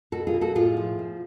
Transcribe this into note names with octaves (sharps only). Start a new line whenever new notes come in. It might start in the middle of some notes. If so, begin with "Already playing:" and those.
B2 F#4 A4
F4 G#4
B2
F#4 A4
A2 F4 G#4
F3
B2